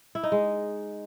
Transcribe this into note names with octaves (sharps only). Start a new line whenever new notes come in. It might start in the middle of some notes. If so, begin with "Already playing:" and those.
E4
D#4
G#3